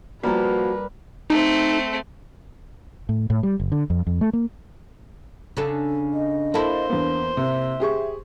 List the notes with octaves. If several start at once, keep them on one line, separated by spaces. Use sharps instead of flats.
F3 G3 A#3 F#4 A#4 B4
A3 C4 D#4
A2
A2
G3
F#1
D3
F2
F2
A3
A#3
C#3 D4 A4
D#5
A#3 E4 A4 C5
E2 B3 D4
C3 E5
G4 G#4 C#6